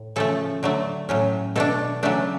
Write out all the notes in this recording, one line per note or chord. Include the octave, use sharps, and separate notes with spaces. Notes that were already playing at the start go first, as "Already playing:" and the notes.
Already playing: A2
C#3 F3 A3 A4
D3 F#3 A3
A2 F#3 C#4
B2 A3 D4 A4
C#3 F#3 A3 D4